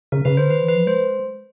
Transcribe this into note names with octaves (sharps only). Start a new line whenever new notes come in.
C#3 A#4
C#3 B4
D3 C5
D#3 B4
E3
B4
F3
G#3 C5